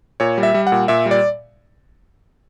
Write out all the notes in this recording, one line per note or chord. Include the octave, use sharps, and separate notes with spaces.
A#2 C#5
G3
E5
G3
F#5
A#2
A#2 E5
G3
D5